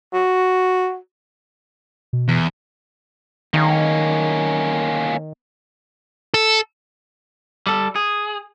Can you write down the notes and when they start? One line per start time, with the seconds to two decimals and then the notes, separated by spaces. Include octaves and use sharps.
0.13 F#4
2.13 B2
2.28 E2
3.54 D#3 A#3 C#4
6.34 A4
7.67 G3 A4
7.96 G#4